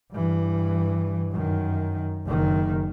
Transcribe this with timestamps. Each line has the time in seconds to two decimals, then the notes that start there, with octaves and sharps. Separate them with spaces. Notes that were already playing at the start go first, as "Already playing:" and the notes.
0.12 G2 E3
1.31 F#2 D#3
2.26 F#1 D#3